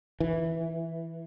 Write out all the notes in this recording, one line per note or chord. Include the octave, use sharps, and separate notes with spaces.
E3